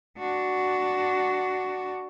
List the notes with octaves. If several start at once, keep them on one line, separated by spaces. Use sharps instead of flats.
D4 F#4